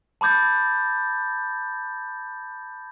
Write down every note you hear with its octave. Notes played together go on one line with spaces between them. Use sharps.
A5 B5 D6 G6 A6